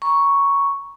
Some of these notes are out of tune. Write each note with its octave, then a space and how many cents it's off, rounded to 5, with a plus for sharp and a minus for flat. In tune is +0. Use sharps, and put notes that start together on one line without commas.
A#5 +30 C#6 +0